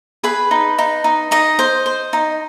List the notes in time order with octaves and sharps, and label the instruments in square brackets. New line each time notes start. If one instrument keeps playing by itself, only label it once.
[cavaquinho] G#4 B4 B5
D#4
D#4
D#4
D#4 D#5
C5
C5
D#4